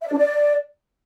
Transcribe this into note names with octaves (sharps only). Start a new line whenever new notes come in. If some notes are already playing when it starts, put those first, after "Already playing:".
E5
D5
D4
D5